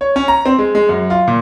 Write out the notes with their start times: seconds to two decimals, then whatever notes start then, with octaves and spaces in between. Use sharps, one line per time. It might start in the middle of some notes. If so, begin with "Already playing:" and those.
0.01 C#5
0.16 C#4
0.28 A#5
0.45 C4
0.59 G#3
0.75 G#3
0.89 F#2
1.10 F4
1.27 A#2